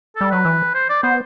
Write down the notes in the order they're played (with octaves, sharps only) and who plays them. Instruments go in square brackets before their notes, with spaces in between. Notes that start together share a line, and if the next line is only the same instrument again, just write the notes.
[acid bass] G3 [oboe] A4
[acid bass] F#3 [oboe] B4
[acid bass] E3
[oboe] C5
D5
[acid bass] B3 [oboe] C5